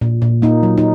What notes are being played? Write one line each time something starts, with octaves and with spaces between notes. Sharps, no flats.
A#2
A#2
A#3 D#4
F#3
D#4